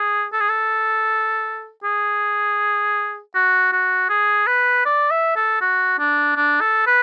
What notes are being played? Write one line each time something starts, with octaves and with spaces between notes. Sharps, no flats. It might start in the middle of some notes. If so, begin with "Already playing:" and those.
Already playing: G#4
A4
G#4
A4
G#4
F#4
F#4
G#4
B4
D5
E5
A4
F#4
D4
D4
A4
B4